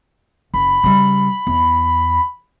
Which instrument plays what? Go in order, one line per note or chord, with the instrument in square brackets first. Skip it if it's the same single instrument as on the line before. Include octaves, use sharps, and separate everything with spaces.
[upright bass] F#1 [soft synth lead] B5
[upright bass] C#3 G3
E2